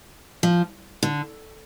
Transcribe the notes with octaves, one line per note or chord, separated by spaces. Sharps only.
F3
D3